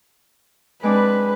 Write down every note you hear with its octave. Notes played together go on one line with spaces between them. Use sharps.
G#3 C4 D4 B4 B5